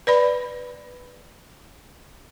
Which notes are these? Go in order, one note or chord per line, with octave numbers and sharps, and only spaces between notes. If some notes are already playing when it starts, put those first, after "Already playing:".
B4 D5 B5